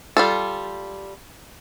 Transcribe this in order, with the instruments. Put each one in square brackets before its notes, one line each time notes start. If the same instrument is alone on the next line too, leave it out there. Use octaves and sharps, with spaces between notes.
[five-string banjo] G3 F4 A4